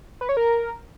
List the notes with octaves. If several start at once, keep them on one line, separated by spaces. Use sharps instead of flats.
B4
C#5
A#4